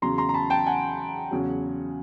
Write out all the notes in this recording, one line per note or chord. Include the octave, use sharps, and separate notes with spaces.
E2 C#3 F#3 A#5 C6
A#5 C6
A#5
A5 B5
G5 A5
F#5 G#5
E2 C#3 F#3